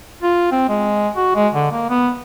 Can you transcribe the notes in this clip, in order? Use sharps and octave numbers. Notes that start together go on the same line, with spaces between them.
F4
C4
G#3
F#4
G#3
D3
A#3
B3